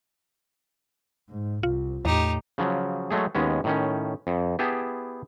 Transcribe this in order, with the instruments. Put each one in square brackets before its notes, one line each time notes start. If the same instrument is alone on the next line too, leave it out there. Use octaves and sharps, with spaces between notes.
[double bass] G#2
[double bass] C2 [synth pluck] F4
[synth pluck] E2 [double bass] A2 [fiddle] D#4 G4
[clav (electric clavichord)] C#3 F3 F#3
F#3 G#3 A3 G#4
D#2 G#3 B3 C#4
A2 D#3 C#4
F2
B3 E4 G4 G#4 G5 A5